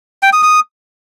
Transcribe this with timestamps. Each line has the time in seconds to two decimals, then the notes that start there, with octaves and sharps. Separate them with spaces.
0.23 G5
0.33 D#6
0.43 D#6